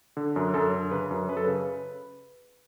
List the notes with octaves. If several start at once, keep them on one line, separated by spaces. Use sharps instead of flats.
D3
F#2
F#2 A4
D3
C#3 B4
F#2
F#2 B4
A4
C#3 B4